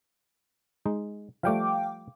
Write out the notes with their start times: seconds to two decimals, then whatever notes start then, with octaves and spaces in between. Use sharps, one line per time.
0.86 G#3 D#4
1.43 F3 G3 A3 F5 G5 D6